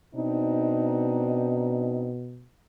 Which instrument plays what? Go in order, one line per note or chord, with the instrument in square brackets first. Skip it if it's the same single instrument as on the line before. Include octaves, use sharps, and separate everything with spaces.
[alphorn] B2 [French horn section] C4 D4 D#4